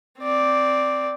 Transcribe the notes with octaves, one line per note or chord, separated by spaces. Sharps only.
C4 D5